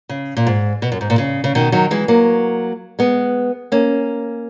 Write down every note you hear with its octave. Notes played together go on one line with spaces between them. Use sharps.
C#3
A#2
G#2
B2
F#2
G#2
A#2
C#3
C#3
B2 D#3
D#3 F#3
E3 G#3
F#3 A#3
G#3 B3
A#3 C#4